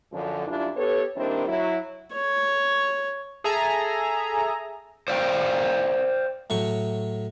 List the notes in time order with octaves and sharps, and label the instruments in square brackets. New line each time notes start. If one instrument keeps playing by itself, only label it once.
[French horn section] F#2 D3 F3
F#2 G3 D4 E4 F4
B3 G4 A4 B4 C#5
D#3 G3 A#3 C4 D4 E4
F#3 E4
[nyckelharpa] C#5
[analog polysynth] G#4 A4 E5 G#5 A#5
[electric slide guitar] C5 D5 F5 G5
[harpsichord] A2 F#3 C#6